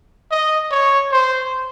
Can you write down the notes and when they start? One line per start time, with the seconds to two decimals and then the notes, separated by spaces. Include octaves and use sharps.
0.31 D#5
0.71 C#5
1.12 C5